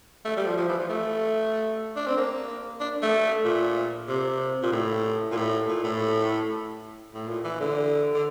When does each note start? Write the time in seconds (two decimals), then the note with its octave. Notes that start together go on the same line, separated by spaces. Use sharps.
0.25 A3
0.37 G3
0.46 F3
0.57 F3
0.68 E3
0.78 F3
0.89 A3
1.96 D4
2.07 C4
2.17 A#3
2.80 D4
3.02 A3
3.45 A#2
4.08 C3
4.62 A#2
4.72 A2
5.31 A#2
5.37 A2
5.68 A#2
5.84 A2
7.14 A2
7.28 A#2
7.44 E3
7.60 D3
8.14 D3